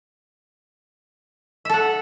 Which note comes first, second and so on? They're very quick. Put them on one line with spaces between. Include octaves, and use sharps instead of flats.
E5 A4 F#5